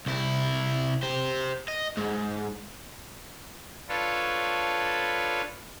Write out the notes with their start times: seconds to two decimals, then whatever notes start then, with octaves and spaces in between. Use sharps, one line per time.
0.06 C2 E4
1.03 G4 C5
1.68 D#5
1.97 G#2
3.89 D4 F4 A4 B4 C#5